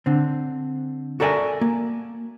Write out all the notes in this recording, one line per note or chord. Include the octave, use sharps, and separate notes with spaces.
D3 C4
F#4 A4 A#4 D5 E5 G#5
A#3